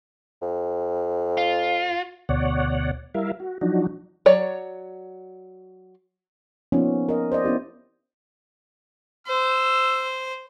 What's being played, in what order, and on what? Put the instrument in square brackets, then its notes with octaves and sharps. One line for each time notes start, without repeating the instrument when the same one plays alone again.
[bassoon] F2
[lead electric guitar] F4
[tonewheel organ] D2 B2 C#5 D5 F#5
G3 E4 A#4 E5 F5
F#4
F3 F#3 D4 D#4 F#4
[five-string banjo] F#3 C#5 D5
[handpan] F3 A#3 B3 C#4 D#4
A#4 D#5
C5 D5 D#5
B3 C#4 E4 G4
[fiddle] C5 [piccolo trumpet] E6